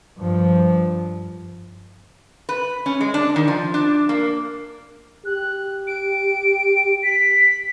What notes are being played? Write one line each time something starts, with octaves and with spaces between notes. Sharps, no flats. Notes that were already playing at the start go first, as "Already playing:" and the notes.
G2 F3
B4
C#4
G#3
D4
D#3
F3
D4
A#3
G4 F#6
D7
B6